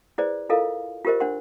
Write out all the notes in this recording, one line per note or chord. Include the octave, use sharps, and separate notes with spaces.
E4 G#4 B4 C5 D5
E4 F4 A4 A#4 D#5 F5
F4 G4 A#4 C5 D#5
D4 C5 F#5 C6